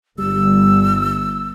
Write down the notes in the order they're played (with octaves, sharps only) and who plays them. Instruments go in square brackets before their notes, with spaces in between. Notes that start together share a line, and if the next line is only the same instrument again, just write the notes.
[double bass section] G1 [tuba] G3 [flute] E6